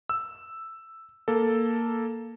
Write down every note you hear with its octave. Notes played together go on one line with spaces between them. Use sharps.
E6
A#3 A4